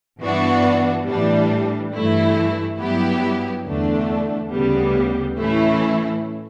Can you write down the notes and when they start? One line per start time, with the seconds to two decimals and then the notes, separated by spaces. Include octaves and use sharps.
0.21 G2 E3 B3 D4 F#4
1.07 A2 E3 G3 D4
1.94 G2 E3 A3 E4
2.80 G2 F#3 B3 E4 G4
3.66 E2 D3 A3 D4
4.52 D2 C#3 G3 B3
5.38 A2 E3 A3 C#4 E4